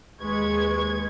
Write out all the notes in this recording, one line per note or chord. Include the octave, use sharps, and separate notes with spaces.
D#2 G#3 B4 C#6 G#6